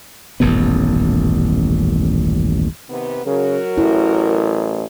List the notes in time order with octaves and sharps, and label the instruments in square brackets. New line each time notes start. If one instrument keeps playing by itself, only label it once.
[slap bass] D#1 A1 F#2 B3
[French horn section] C3 D#3 B3
[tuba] C#3 [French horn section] F#3 F#4 A#4
[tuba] A1 [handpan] E4